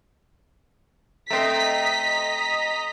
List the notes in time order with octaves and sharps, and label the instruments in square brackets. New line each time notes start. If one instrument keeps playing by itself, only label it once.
[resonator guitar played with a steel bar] A3 C4 [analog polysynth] D#5 A#5 [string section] B6